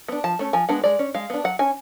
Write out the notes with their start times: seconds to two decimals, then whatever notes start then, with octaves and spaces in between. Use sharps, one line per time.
0.08 B3 D4
0.24 F3 A5
0.39 A3 C#4
0.53 F3 G#5
0.69 G#3 B3 D4 F#5
0.84 G#3 D5
0.99 C#4
1.15 G#3 F5
1.30 B3 D4
1.44 F#3 F#5
1.59 C#4 G#5